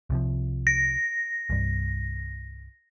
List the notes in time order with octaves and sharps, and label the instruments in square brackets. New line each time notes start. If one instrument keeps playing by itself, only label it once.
[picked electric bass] C2 C3 F3
[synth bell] A#6
[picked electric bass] C2 G2